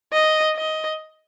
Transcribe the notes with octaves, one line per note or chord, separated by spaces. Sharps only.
D#5
D#5